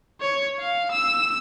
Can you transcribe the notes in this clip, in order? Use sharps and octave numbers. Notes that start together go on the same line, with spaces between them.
C#5
F5
E6